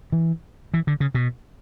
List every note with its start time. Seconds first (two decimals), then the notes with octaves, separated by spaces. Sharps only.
0.12 E3
0.74 E3
0.87 D3
1.00 C#3
1.15 B2